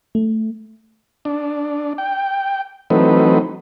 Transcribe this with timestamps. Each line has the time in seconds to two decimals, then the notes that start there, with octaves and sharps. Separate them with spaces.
0.15 A3
1.25 D4
1.98 G5
2.90 E3 F#3 A3 C4 D#4 B4